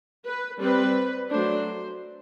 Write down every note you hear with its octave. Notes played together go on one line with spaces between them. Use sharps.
B4
G3 C4 B4
F#3 A3 D4 C5